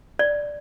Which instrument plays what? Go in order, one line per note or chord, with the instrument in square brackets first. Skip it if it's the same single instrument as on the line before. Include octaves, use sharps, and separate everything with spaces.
[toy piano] D5